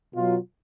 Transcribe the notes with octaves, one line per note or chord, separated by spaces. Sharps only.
B2 F#3 F4